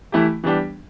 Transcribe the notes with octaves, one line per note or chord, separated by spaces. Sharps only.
E3 A3 E4 G4
E3 G3 B3 D4 G4